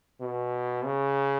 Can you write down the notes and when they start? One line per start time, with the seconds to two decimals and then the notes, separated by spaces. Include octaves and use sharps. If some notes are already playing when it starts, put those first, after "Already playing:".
0.21 B2
0.85 C#3